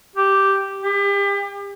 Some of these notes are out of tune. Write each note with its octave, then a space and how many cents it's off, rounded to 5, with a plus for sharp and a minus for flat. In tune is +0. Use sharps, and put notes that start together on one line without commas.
G4 -5
G4 +35